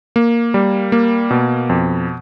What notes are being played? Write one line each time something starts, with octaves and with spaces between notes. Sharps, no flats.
A#3
G3
A#3
B2
F2